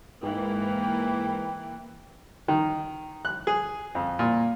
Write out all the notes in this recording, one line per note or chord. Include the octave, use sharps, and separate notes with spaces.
G#2 E3 A#3 G5
D#3
F#6
G#4
F2
A#2